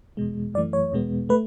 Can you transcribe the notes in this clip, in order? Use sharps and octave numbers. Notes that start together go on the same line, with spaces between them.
E2 B2 G#3
F#2 E3 A3 D5
C#5
E2 B2 G#3 B3
A3 B4